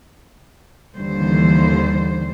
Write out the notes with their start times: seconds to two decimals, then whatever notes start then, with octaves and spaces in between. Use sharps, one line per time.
0.96 D#2 D3 E3 G3 C5